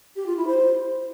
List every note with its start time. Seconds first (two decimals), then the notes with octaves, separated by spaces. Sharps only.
0.16 G4
0.26 F4
0.37 E4
0.47 C5